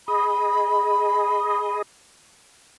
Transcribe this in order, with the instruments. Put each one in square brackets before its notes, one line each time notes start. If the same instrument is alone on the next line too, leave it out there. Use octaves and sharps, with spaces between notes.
[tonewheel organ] G#4 D#5 [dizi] B5